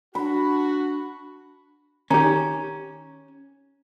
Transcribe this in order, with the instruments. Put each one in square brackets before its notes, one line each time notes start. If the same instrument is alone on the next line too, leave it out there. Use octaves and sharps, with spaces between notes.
[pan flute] D4 [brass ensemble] F#4 [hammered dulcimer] B5
[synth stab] D#3 G4 [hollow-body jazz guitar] C#4 [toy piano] A#5